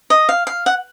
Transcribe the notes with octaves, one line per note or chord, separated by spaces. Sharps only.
D#5
F5
F5
F#5